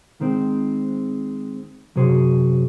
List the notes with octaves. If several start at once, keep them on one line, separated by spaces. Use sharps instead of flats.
D#3 G#3 C4
F#2 C3 F#4 G#4 C5